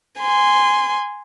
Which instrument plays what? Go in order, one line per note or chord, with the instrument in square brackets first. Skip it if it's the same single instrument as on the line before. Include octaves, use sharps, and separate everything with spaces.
[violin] G#5 C6